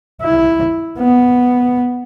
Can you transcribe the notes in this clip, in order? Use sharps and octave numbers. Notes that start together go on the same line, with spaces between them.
E4
B3